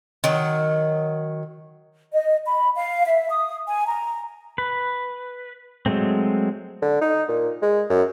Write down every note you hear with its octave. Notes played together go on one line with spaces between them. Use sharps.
D#3 F#3
D#5
B5
F5
E5
D#6
G#5
A#5
B4
F#3 G#3 A3 C4
D3
D#4
A#2
G#3
F#2